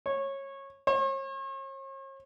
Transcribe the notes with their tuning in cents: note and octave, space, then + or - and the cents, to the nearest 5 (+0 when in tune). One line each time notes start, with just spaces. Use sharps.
C#5 -20
C#5 -45